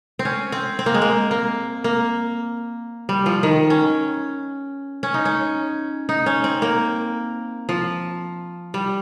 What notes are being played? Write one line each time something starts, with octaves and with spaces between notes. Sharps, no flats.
C4
C#4
C4
C4
A#3
G#3
A#3
A#3
A#3
G3
F3
D#3
C#4
C#4
D#4
C#4
D#4
C#4
C4
A#3
F3
G3